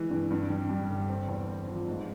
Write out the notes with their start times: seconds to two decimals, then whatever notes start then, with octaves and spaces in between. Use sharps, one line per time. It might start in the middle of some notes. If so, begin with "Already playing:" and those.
Already playing: E3 G#3
0.10 G2
0.30 G2
0.50 G3
0.69 G3
0.89 G1
1.09 C4
1.28 E2
1.48 C4
1.68 F3
1.88 G#2